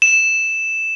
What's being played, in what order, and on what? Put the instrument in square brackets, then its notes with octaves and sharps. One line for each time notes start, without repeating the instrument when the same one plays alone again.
[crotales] E7